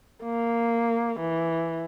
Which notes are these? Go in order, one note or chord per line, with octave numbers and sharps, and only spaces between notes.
A#3
E3